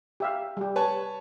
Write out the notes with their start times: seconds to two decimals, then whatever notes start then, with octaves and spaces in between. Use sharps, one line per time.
0.20 G4 E5 F5
0.57 G3 G4
0.76 B4 C#5 A5